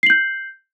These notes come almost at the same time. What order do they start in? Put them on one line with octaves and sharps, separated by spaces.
C7 F#7 G6